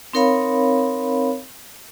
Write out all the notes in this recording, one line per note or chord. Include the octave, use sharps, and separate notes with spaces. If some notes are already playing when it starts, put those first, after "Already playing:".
C4 D#4 A#4 C#5 F5 B5